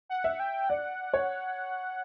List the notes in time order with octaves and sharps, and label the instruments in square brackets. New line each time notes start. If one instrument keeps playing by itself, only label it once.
[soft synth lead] F#5
[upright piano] E5
[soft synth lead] G5
[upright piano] D5 [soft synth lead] F#5
[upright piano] C#5